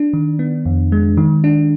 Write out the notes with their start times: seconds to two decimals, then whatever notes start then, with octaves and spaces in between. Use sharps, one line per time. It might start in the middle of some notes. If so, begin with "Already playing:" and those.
Already playing: D4
0.13 D#3
0.39 B3
0.66 F2
0.92 G#3
1.17 D#3
1.44 D4